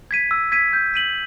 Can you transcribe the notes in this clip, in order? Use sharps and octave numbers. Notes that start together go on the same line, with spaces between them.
G#6 B6 D#7
E6
G#6 B6 D#7
G6
B6 D#7 F#7